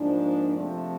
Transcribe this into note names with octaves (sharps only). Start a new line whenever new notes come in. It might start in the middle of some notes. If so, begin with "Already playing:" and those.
Already playing: G#2 F3 A#3 D4
F2 C3 F3 A3 C4